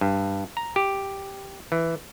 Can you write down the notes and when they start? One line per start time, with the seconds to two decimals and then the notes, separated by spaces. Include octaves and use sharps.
0.01 G2
0.57 A#5
0.76 G4
1.72 E3